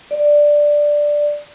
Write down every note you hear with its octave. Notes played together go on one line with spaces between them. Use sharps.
D5